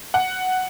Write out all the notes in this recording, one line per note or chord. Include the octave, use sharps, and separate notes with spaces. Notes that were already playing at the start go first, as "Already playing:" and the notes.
F#5